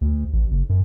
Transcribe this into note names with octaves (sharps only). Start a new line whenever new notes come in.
D2
A1
F#1
F#2